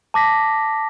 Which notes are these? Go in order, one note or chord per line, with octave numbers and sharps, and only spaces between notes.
A5 D6 A#6 B6